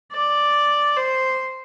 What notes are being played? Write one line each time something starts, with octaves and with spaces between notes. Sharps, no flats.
D5
C5